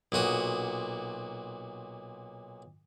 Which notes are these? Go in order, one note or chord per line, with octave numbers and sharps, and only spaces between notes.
B1 A#2 F#4 D#6